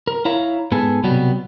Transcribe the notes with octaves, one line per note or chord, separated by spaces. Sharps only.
A#4
E4 C#5 F5 A#5
G#2 B3 G#4 A4
C2 B2 F#3 G3 B3